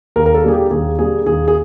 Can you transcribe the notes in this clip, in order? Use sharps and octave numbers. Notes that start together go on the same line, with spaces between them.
D#2 A#4
A#4
A4
D3 G3 A#3 G#4
G4
D#2 G#4
D3 G3 A#3 G#4
D#2 G#4
G#4